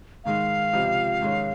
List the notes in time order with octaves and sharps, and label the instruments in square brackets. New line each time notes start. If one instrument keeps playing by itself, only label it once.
[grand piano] G#2 D#3 G#3 [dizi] F5
[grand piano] C#2 C3 F3
G#2 D#3 G#3 C#4